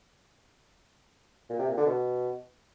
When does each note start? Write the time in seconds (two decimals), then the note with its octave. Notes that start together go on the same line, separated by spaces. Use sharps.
1.50 A#2
1.59 C3
1.68 A#2
1.77 D3
1.87 B2